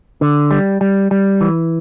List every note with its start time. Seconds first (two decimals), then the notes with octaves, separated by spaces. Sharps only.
0.21 D3
0.51 G3
0.81 G3
1.11 G3
1.41 E3